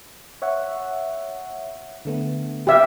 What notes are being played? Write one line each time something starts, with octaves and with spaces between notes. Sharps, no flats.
C#5 E5 F#5
D3 A3 B3
G4 E5 F5